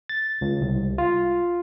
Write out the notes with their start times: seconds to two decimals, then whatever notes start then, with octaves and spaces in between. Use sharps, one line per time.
0.09 A6
0.41 C#2
0.61 C2
0.98 F4